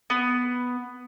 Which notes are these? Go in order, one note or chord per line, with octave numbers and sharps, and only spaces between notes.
B3